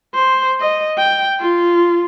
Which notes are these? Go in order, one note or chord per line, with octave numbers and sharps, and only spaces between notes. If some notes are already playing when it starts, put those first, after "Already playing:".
C5
D#5
G5
F4